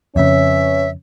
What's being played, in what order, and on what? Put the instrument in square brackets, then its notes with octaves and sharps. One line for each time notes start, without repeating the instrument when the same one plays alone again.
[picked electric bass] F2 C#3 [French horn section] C#4 B4 C#5 [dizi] E5